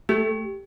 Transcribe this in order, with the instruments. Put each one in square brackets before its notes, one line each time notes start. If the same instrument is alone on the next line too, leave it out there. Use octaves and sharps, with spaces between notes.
[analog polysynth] A3 [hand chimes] G4